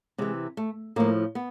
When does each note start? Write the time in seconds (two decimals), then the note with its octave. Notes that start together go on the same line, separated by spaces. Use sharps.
0.18 C3 E3 G#3
0.57 A3
0.96 A2 F3 A#3
1.35 B3